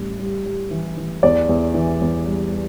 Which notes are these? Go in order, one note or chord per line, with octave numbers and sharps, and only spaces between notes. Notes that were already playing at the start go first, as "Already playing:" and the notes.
Already playing: A1 G3
G3
G3
E3
E3
E2 D5
E2
E3
E2
G3
G3